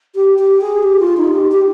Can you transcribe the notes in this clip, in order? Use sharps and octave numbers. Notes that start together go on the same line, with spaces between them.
G4
G4
G#4
G4
F4
D#4
G4
G4